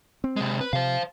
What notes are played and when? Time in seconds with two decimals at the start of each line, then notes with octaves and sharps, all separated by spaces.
0.24 C4
0.36 C3 G#3
0.61 B4
0.73 C3 C5 F5